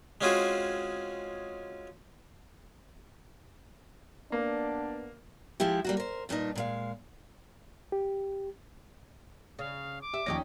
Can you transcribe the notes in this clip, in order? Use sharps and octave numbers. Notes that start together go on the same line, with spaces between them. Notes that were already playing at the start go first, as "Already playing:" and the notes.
G#3 C4 C#4 F4 F#4 G#4
A#3 B3 D4
F3 G#3 E4 G4
G3 A#3 F#4
A#4 C5
G2 A#2 D4 D#4
A#2 G#3 F5
G4
C#3 F5
D6
G4 E5
D#2 F3 C#4 D#4 G4 A#6